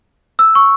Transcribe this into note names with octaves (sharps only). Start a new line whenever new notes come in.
E6
C#6